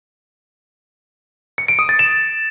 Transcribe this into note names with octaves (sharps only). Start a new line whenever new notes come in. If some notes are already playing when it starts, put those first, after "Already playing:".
C#7
D7
D#6
A6
E7